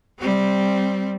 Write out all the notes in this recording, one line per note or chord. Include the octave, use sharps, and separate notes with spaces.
G3 C4